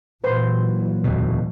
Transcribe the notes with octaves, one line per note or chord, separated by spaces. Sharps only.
A#2 E3 F#3 B4 C5 C6
E1 D2 B2